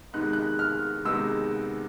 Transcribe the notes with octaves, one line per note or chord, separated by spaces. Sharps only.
C3 D#3 G#3 B3 D#4 F#6
F#6
F6
C3 D#3 G#3 B3 D#4 E6